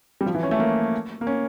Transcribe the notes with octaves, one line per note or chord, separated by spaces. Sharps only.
G3
F3
E3
C#4
A3
A#3
A#3
C#4